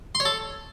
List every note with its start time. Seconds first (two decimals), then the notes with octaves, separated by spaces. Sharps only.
0.15 C6
0.20 C#5
0.25 A4